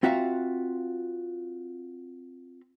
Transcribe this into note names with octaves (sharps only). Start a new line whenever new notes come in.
C4 F4 F#4 E5 F5 A#5